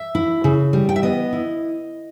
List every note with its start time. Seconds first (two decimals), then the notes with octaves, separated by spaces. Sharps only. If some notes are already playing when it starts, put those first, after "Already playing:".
Already playing: E5
0.15 E4
0.44 C#3
0.73 G3
0.89 G5
0.96 E5
1.03 B3 D#5
1.33 E4